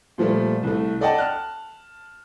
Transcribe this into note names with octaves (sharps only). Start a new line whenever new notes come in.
A#2 F3 G3 A3
C2 A3
A4 D5 D#5 F#5 G5 A5
A5 F6 F#6